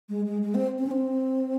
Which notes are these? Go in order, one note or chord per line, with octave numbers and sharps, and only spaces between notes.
G#3
G#3
G#3
C4
C4
C#4
C4